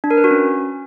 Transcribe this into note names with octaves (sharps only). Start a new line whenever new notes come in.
D4
A#4
B4
F#4
C#4